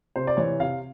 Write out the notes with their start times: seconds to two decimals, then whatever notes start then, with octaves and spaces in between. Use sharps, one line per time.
0.16 C3 C5
0.27 D5
0.37 E3 C#5
0.60 C3 F5